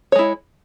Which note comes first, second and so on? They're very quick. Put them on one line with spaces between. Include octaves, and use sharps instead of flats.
C#5 G#3 E4